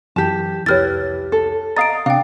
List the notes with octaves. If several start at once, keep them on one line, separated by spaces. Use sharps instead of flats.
F#2 E3 G4 A5
C2 F2 E4 G4 B4 C#5 F6 A6
A4
D#5 F5 A#5 D#6 A6 D7
C3 D4 F5 G5